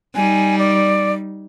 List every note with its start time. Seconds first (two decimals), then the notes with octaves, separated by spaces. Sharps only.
0.15 G3 D#4 G#5
0.58 D5